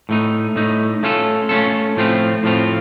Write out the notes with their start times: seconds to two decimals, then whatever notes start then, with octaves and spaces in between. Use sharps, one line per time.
0.09 A2 A3 D#4
0.56 A2 A3 D#4
1.03 A3 C#4 F4 A4
1.49 A3 C#4 F4 A4
1.96 A2 F3 A3 C4 F4
2.43 A2 F3 A3 C4 F4